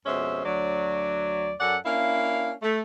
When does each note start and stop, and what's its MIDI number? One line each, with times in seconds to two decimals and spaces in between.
0.06 0.43 41
0.06 0.43 47
0.06 0.43 56
0.06 0.43 61
0.06 0.43 72
0.06 0.43 76
0.46 1.52 38
0.46 1.52 54
0.46 1.52 74
1.60 1.76 42
1.60 1.76 61
1.60 1.76 69
1.60 1.76 74
1.60 1.76 78
1.86 2.53 58
1.86 2.53 61
1.86 2.53 62
1.86 2.53 64
1.86 2.53 77
2.62 2.81 57